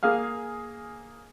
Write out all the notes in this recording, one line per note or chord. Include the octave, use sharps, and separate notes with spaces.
A#3 G#4 F5 F6